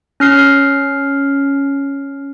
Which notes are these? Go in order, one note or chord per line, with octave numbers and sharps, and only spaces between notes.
C#4 F6 C7